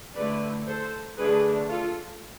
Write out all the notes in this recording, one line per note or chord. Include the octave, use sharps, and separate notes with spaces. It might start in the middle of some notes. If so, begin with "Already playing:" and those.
D3 A3 E4 B4 D5
A4 C5
D3 A3 D4 G#4 B4
F4 A4